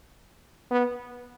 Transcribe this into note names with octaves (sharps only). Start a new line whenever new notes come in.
B3